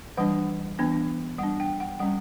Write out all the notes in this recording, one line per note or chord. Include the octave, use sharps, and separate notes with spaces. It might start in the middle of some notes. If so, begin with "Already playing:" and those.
E3 G3 D4 F#5
E3 B3 D4
G3 D4 F#5
G5
F#5
G3 C#4 F#5